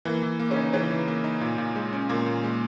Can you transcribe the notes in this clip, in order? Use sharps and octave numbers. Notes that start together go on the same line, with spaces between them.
E3 A#3
E3
A#3
C#3 C#4
D#4
C#3 E3 C#4
E3
A#3
D#4
A#2
A#2
G#3
C#4
A#2 A#3
A#2
G#3